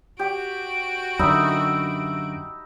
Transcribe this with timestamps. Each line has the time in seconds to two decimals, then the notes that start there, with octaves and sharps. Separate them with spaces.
0.19 F#4 G4 D7
1.19 F#2 D3 D#4 E5 B5